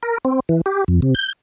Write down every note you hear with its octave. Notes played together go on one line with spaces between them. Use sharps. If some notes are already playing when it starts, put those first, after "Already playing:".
A#4
C4
E3
G4
F2
C3
G6